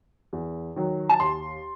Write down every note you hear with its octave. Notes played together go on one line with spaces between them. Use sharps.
E2
D#3 F#3
A5
D#2 C6